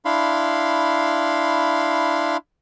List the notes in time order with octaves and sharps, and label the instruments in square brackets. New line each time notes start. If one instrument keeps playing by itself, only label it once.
[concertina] D4 E4 F5 B5 C6